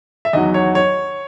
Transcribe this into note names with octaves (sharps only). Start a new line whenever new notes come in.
E5
E2 D#3 F#3 D#5
C#5
C#5